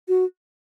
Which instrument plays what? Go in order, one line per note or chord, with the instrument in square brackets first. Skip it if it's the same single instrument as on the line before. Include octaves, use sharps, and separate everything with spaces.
[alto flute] F#4